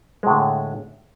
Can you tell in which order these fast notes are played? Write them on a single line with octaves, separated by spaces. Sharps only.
G#3 A2 D3